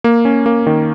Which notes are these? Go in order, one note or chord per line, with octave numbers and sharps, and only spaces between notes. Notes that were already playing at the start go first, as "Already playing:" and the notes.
A#3
C#4
A#3
D#3